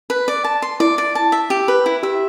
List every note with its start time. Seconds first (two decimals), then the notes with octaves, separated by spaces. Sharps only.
0.10 B4
0.28 D5
0.44 A5
0.62 C6
0.80 E4 D5
0.98 D5
1.15 A5
1.32 E5
1.50 G4
1.68 B4
1.86 E4
2.03 G4 E5